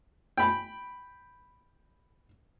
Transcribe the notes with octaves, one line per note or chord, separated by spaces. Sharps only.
G5 B5